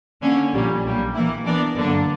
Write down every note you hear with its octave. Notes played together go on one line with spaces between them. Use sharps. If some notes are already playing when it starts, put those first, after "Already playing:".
D3 A#3 C#4
A#1 A#2 G3 A#3 C#4
B1 A#2 G3 A#3
E3 A#3 E4
E3 B3 D4 A#4 D5
G1 F#2 D3 A#3 D4